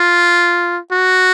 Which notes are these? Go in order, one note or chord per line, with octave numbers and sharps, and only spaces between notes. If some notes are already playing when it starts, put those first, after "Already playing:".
Already playing: F4
F#4